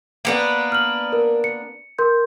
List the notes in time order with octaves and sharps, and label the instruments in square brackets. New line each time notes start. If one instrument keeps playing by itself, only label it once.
[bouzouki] A#3 B3 D4
[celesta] F6 F#7
A#4
C#7
A#4 C6 G6